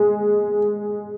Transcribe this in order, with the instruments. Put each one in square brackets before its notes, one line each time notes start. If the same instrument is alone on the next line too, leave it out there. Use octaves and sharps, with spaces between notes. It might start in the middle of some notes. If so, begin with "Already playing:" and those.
Already playing: [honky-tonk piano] G#3